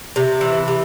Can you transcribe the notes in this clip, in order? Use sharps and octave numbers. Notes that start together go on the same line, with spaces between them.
C3
E3
C3